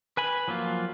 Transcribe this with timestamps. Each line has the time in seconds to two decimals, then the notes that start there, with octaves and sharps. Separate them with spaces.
0.17 B4 G#5 B5
0.48 F3 F#3 A#3 F4